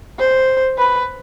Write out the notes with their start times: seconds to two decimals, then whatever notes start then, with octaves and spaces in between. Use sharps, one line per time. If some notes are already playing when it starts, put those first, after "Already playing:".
0.19 C5
0.78 B4